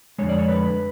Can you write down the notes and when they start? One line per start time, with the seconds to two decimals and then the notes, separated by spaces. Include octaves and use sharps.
0.18 F2 D3 G#3 C#5
0.29 D5
0.39 C#5
0.48 B4